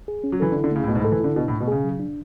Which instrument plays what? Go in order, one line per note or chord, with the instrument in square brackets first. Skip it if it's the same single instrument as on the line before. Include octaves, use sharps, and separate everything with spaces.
[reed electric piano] G#4
C#4
[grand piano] F#3
[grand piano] E3 [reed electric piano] A4
[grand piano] D3
[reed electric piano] E4
[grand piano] D3
[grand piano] C#3 [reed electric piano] A3
[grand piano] A2
[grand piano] B2 [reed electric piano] A3
[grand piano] G#2
A2
[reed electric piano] A4
[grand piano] E3
[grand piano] D3 [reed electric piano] E4
[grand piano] B2 [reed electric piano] D4
[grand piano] A2
[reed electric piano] A3
[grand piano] B2
[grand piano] C#3 [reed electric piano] G#4
[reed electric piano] F#3
D4